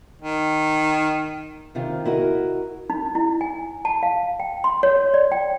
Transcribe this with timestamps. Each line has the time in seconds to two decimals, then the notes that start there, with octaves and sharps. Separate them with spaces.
0.21 D#3
1.75 C3 D#3 F4
2.05 E4 F#4 A#4 D#5
2.90 D#4
3.15 E4
3.41 G#5
3.85 A5
4.03 F5
4.40 G5
4.64 C6
4.83 C#5
5.14 D5
5.32 G5